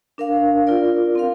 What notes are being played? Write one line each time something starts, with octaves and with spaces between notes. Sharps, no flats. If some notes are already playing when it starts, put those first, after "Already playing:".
D4 A#4 F5
F4 A#4 D5
C4 A#4 F5